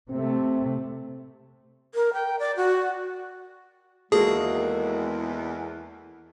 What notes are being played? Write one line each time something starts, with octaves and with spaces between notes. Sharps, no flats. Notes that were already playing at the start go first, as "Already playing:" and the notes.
C3 A3 C4
A#4
G5
D5
F#4
E2 D#3 G#3 A#3 F#4 G#4 A4